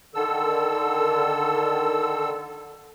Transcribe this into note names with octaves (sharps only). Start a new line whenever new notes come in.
D3 D#3 A4 E6